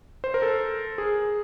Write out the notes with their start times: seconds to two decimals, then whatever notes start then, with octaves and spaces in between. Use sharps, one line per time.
0.24 C5
0.34 A#4
0.42 A4
0.98 G#4